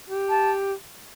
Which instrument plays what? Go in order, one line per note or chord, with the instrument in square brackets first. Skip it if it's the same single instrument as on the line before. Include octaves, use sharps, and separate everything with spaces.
[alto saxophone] G4
[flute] A5